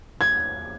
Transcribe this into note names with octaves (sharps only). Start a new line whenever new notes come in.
G#6